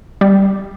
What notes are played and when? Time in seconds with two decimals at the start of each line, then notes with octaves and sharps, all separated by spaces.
0.21 G3